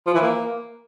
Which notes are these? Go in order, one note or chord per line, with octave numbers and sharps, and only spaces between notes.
F3
E3
A#3